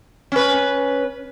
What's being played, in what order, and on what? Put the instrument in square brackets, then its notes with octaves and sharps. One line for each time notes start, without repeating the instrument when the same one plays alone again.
[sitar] C#4 B4